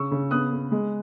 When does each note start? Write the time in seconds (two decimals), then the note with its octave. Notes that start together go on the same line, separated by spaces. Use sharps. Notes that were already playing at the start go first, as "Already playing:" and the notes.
Already playing: C#3 C#6 E6
0.11 C#3
0.31 B3 D#6 F#6
0.51 B3
0.72 G#3